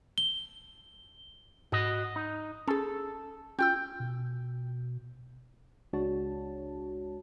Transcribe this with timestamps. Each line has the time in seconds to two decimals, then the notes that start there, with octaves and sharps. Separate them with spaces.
0.18 G7
1.72 G#2 F#4 D#5
2.16 D#4
2.68 C#4 G#4 A4
3.59 C#4 F4 G5 E6
4.00 B2
5.93 C#2 G#3 D4 F#4 C#5 A5